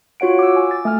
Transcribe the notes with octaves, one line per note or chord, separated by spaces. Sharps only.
F4 F#4 C#5 F#5 D7
D6 E6
G#5
A6
A3 G#5 F6